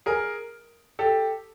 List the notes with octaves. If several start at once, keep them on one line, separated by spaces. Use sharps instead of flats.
G#4 A#4
G4 A4